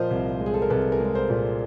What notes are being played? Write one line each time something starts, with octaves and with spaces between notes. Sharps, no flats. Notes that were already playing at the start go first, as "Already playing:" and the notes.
Already playing: A#2 F3 A#4 C5 D#5 F5
C2
G#3
G#4
A4
A#4
C2 A4 B4
G#4 A#4
G#3
A#4 C5
A#2